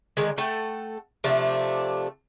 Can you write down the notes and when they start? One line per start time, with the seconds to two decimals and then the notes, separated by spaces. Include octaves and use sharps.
0.17 D3 D#3 G#3
0.38 A3 A4 F#5 G5
1.24 C3 F3 A3 D4